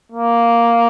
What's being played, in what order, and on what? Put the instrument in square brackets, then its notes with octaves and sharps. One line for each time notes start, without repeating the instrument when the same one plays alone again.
[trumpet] A#3